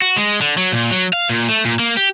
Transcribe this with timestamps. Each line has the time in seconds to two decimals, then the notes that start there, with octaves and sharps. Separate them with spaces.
0.02 F#4
0.16 G#3
0.41 D3
0.58 F#3
0.72 A#2
0.91 F#3
1.13 F5
1.29 A#2
1.48 A3
1.65 A#2
1.80 A#3
1.97 G4